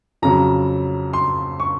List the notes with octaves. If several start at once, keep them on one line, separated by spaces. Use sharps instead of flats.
F2 C#3 F#3 A#5
C6
C#6